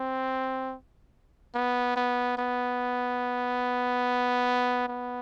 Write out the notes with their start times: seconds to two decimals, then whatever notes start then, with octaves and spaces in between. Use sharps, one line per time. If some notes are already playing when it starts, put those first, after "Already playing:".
Already playing: C4
1.54 B3
1.96 B3
2.38 B3
4.88 B3